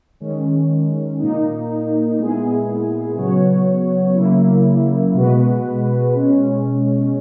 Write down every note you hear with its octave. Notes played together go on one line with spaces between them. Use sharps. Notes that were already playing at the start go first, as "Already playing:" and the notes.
D#3 G#3 C#4
A#2 A#3 D#4
A#2 G#3 B3 E4 G#4
C#3 F#3 B3 F#4 C#5
C#3 F#3 A#3 E4
B2 G#3 B3 F#4 B4
B2 G#3 C#4